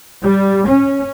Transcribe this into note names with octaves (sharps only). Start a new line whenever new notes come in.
G3
C#4